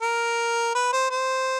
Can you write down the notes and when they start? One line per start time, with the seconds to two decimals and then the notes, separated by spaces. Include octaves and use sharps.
0.02 A#4
0.75 B4
0.92 C5
1.10 C5